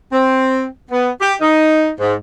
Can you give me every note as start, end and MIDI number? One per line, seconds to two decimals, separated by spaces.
0.12 0.64 60
0.91 1.10 59
1.20 1.34 67
1.41 1.90 63
2.00 2.13 44